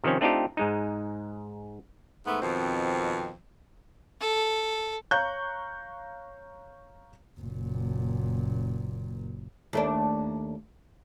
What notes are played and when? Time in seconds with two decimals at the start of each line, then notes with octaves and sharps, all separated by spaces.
0.04 C3 D#3 F3 C4 C#4
0.21 A3 C4 D4 D#4 F4 G4
0.57 G#2 G#3 D#4
2.26 G#2 E3 A3 B3
2.41 F2 B2 D#3 C4
4.21 A4
5.11 C#5 F5 A#5 C#6 F#6 G6
7.40 F#1 A#2
9.73 D#2 A3 D4